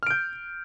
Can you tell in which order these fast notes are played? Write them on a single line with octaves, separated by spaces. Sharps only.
F6 D7 G6